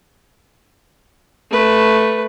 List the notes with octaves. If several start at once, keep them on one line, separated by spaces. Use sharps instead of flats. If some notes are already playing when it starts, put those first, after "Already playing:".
A3 B4